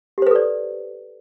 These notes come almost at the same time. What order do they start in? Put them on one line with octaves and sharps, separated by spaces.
G4 C5 B4 A4 D5